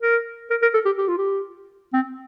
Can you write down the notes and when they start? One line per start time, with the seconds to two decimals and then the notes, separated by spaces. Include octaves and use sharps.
0.02 A#4
0.51 A#4
0.62 A#4
0.74 A4
0.85 G4
0.98 G4
1.08 F4
1.18 G4
1.93 C4